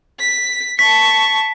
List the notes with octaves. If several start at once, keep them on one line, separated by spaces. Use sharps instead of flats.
B6
A5 C#6 B6